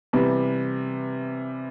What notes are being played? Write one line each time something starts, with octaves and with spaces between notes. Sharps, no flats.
C3 E3 G3